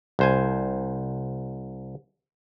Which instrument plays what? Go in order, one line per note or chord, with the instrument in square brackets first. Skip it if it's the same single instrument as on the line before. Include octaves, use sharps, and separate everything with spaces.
[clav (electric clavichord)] C2 C5 G#5